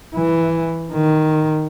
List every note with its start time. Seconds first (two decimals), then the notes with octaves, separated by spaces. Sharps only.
0.15 E3
0.93 D#3